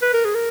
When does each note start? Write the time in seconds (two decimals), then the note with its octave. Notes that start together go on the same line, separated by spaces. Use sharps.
0.02 B4
0.13 A#4
0.25 G#4
0.35 A#4